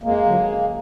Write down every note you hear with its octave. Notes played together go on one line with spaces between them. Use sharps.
F2 G#3 A#3
D3 F#3
F#2